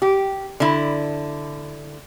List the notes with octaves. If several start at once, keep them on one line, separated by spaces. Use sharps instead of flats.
G4
D3 E4